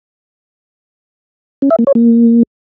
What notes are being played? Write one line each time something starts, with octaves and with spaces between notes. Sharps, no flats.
C#4
E5
A#3
C#5
A#3